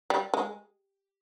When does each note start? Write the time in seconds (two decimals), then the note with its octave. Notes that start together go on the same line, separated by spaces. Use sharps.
0.10 G3
0.34 G#3